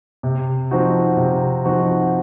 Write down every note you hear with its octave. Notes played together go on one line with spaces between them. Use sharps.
C3
F3 C4 D#4 F#4
C3
F3 C4 D#4 F#4